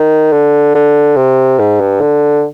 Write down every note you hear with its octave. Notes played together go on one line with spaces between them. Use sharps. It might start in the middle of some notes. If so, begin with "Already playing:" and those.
Already playing: D#3
D3
D3
C3
G#2
G2
D3